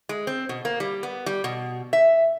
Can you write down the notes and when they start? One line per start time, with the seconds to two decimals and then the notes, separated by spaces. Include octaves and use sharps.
0.09 G#3
0.27 C4
0.49 B2
0.65 A#3
0.80 G3
1.03 B3
1.26 G3
1.44 B2
1.93 E5